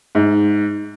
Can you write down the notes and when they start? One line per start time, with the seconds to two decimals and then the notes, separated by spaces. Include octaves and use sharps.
0.15 G#2